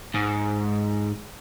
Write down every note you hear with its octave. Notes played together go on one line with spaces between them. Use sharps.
G#2